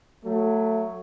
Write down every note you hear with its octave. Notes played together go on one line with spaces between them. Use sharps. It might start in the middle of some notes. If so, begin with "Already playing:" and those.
F#3 A3